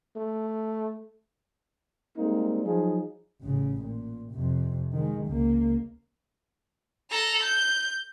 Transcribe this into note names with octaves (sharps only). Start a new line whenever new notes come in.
A3
G3 G#3 A#3 C4 D#4
F3 F#3 D#4 G#4
A1 C#3
A#2
F2 C3
D#3 G#3
C#2 A#3
A4 A#5
G6